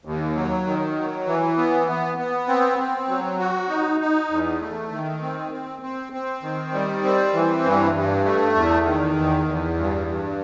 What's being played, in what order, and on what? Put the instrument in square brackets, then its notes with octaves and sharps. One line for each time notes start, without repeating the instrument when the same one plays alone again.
[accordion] D#2
F#3
D#3
F#3
E3
B3
B3
B3
C4
C4
F#3
F#4
D#4
D#4
E2
A3
D#3
C4
C4
C4
C4
D#3
G3
C4
E3
G2
G2
A3
E2
D#3
E2
E2
G2
G2